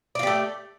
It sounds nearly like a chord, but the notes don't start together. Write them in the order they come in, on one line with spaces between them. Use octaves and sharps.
D5 F4 G4 A3